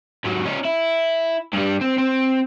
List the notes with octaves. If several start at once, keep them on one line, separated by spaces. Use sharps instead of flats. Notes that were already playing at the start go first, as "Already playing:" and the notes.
G#2 F#3
C#4 D#4
E4
G2 G3
C4
C4